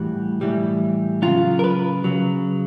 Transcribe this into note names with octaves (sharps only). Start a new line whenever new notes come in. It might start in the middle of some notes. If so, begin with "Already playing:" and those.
Already playing: A2 E3 G3 F#4
A2 E3 G3
C#3 F#3 F4
A#4
B4
C#3 F#3